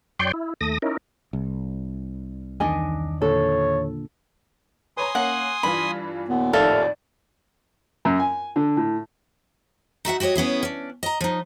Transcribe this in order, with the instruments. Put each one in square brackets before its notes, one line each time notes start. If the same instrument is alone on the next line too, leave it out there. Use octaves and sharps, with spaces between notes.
[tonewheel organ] F#2 C#5 D5 G5 C6 G6
E4
D#2 A3 D#6 A#6
C#4 D#4 E4 A#4
[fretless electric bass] C2
[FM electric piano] E2 D#3 [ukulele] D4 D#5 G#5
[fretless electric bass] A#2 D3 [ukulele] A4 [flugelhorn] C#5
[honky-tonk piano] B4 C#5 A#5 [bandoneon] G#5 C6 D#6
[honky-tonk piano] A#3 C#4 C7 [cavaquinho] F#5
[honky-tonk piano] G2 E3 F4 [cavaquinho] B5
[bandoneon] D#2 A#2 [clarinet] B3
[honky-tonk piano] F2 A2 D#3 [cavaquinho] A4 E5 F5 [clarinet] D5
[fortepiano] F#2
G#5
D3
A2
[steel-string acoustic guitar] D#4 F#4 E5 F#5
F#4 G4 A#4 C#5 D#5
B3 C#4 E4 G#4
C#4 D4
D#5 A#5
F3 D#4